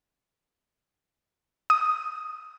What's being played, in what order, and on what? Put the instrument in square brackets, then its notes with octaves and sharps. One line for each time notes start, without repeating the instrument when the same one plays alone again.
[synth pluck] D#6